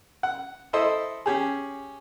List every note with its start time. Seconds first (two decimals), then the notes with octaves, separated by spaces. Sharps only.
0.23 F#5
0.73 E4 A4 C5 D#5
1.26 C#4 G4 G#4